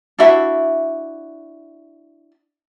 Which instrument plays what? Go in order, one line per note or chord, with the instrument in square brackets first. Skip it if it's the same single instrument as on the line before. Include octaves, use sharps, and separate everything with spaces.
[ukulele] D4 E4 F#4 E5